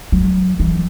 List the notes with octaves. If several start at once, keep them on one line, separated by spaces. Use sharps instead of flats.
F#3
E3